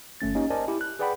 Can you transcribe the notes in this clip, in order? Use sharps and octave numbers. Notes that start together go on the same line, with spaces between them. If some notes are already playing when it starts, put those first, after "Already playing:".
G1 A3 C#4 A6
A#3 C#4 D#4 G4 D#5
A#4 C5 D5 D#5 G#5 A5
E4 G4
F#6
G#4 B4 D5 F#5 G5 B5